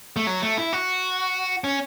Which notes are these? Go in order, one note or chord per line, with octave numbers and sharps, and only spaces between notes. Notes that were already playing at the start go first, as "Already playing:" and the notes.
A3
F#3
A3
E4
F#4
C#4